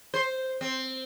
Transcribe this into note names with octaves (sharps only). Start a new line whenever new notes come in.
C5
C4